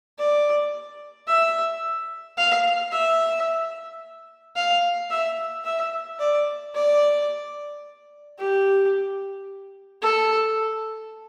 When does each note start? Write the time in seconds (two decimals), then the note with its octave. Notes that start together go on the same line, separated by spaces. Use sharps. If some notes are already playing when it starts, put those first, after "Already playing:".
0.18 D5
1.27 E5
2.37 F5
2.92 E5
4.56 F5
5.10 E5
5.65 E5
6.19 D5
6.75 D5
8.38 G4
10.02 A4